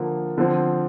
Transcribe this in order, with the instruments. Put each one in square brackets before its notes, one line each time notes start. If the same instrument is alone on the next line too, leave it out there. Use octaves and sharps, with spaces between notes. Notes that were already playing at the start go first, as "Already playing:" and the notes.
Already playing: [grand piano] D3 F3 A#3
D3 F3 C4